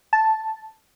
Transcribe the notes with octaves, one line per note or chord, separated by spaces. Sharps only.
A5